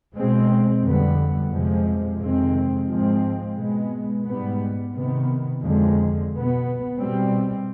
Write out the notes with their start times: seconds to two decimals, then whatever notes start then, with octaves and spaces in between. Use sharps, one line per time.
0.16 B2 G#3 C4
0.84 F2 D3 G3 B3
1.53 F2 C3 F3 G#3
2.20 F2 C3 D#3 G#3 C4
2.90 G#2 F3 G#3 C4
3.58 B2 G#3 B3
4.26 G#2 G3 B3
4.94 C3 D#3 B3
5.61 F2 D3 G#3
6.30 B2 B3
6.98 B2 G3 C4